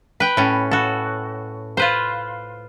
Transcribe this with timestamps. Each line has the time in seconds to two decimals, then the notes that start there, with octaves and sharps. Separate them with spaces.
0.20 B4 G5
0.37 A2 C#4
0.71 F#4 A4
1.77 F4 B4 C5